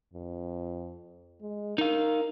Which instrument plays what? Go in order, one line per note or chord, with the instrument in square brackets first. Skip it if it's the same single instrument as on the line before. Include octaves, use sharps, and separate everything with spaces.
[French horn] F2
G#3
[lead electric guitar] D#4 F5 [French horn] A#4